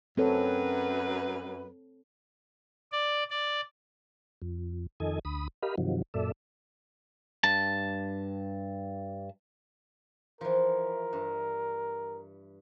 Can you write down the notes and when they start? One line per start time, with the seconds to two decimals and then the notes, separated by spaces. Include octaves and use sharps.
0.17 F#2 C4 A4 B4 C#5
2.92 D5
3.30 D5
4.42 F2
5.00 F2 D#3 A4 D#5 G#5
5.25 D2 B5 D#6
5.63 G4 A#4 D#5 F5 B5
5.78 G2 C3 D#3 F3 F#3
6.14 F#2 A#2 A4 D5 E5
7.44 G2 A5
10.41 E3 F3 A#4
11.13 G2